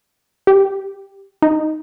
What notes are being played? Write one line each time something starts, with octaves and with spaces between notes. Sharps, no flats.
G4
D#4